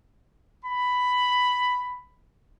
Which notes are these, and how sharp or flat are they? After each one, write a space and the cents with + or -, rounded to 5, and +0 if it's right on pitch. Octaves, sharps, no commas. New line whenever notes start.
B5 +5